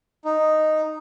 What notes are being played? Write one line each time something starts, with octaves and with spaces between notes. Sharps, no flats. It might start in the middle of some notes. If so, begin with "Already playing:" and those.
D#4